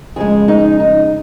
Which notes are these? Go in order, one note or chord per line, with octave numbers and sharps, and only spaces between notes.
F2 C#3 G#3 G#4
D#4
D#4